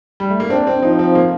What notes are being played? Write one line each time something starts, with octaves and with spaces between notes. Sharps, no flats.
G3
A3
A#3
C4 D4
C4
F3 D#4
C4
A#3